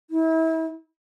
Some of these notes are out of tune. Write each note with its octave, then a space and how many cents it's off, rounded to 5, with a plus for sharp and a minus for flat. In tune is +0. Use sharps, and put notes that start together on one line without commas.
E4 -35